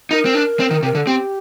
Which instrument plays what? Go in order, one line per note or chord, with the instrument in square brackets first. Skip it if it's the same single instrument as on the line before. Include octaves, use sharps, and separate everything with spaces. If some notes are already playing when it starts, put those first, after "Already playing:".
[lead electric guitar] D#4 [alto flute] A#4
[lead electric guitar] C4
D4
C4
D#3
C3
[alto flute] A#4
[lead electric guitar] D3 [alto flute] A4
[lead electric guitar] C4 [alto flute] G4